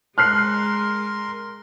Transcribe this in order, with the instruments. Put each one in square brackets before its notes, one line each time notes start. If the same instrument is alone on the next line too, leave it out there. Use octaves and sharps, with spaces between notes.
[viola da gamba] G#3 [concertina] A#4 C6 [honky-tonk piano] F6 F#6 C7